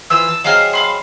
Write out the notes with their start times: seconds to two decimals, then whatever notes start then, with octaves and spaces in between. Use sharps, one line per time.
0.10 E3 F4 C5 E6
0.29 A5
0.44 F#3 G#3 C4 F5 A#5 F6
0.73 F5 B5 C6